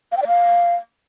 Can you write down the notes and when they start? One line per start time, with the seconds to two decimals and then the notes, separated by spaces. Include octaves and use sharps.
0.12 F5
0.17 G5
0.22 D5
0.27 F5